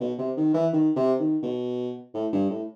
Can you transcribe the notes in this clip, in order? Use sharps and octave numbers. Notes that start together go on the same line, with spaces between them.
B2
C3
D#3
E3
D#3
C3
D#3
B2
A2
G2
A2